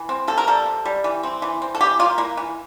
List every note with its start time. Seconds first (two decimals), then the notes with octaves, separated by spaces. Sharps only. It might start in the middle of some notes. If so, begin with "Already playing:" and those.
Already playing: E3
0.09 C4
0.28 C3 A4
0.38 A#4
0.47 G3 A4
0.66 C3
0.85 G3
1.04 E3
1.23 C4
1.42 E3
1.62 C4
1.75 A4
1.81 E3 G4
1.99 A#3 F4
2.18 A#3 E4
2.37 E3